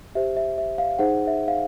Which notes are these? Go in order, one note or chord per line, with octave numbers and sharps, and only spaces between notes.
G4 C5 E5
E5
E5
F5
D#4 G#4 C5 F#5
E5
F5